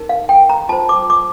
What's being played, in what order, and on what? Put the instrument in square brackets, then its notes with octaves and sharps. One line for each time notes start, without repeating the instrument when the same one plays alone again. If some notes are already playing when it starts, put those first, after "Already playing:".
Already playing: [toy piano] D#4 A#4
F5
G5
A#5
F4 C5 A5
D6
D6